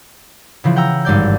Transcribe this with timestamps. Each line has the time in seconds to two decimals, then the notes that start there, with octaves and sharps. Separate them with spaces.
0.64 C#3 E3 F3
0.76 F#5 G5 A#5 E6
1.05 G#1 G2 D5 G6